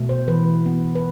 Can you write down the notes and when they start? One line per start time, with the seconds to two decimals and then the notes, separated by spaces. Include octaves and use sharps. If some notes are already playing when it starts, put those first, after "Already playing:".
Already playing: B2 A3
0.09 C5
0.28 E3 B4
0.66 B3
0.95 B4